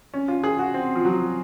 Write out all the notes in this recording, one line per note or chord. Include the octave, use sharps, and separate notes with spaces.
C#4
F4
G#4
F#4
C4
F3
F#3